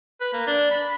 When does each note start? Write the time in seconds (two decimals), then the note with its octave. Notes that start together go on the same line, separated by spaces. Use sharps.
0.21 B4
0.33 A#3
0.47 D4
0.71 B5